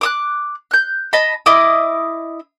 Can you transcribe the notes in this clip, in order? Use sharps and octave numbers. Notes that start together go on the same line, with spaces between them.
D6 D#6 F#6
F#6 G6
D#5 A5 B5
E4 D#5 D6 D#6